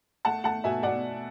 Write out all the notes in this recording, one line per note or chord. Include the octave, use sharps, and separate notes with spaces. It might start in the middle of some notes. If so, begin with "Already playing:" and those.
A3 F#5 A5
A3 F#5 A5
B2 E5 G#5
B2 D5 F#5